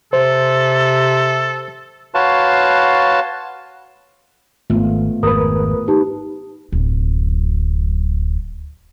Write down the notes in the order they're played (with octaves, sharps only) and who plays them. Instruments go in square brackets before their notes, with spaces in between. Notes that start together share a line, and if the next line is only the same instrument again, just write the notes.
[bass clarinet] C3 [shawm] A4 [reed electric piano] C5
[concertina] F#4 B4 C#5 F5 A5 C6
[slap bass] G#1 [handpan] A3 B3 F4
[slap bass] G#1 F2 [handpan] G#4 [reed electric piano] A#4 B4 [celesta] D#6
[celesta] D#4 G4 A5 [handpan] B4
[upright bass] D1 F#2